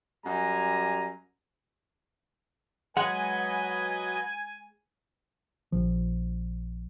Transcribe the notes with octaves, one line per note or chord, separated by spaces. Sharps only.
F#2 G3 G#5 A#5
F#3 G#3 B4 D#5 F#5 G#5
A#1 F3